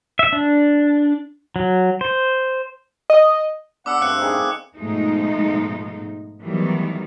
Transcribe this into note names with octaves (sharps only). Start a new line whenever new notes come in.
E5
D4
F#3
C5
D#5
B3 D4 G#4 F#5 D6 E6
G2 A3 C4 F5 E6 F#6 C#7
D#3 G#4
G#2 B2 F3 G#3 A3 D#4
D#3 E3 F#3 G3 A3 B3